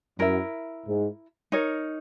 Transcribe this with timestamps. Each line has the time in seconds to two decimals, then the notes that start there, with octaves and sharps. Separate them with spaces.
0.18 F#2 E4 A#4 E5
0.86 G#2
1.52 D#4 A#4 C#5